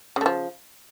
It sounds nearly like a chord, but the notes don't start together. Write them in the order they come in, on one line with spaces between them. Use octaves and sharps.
C#3 A3 F3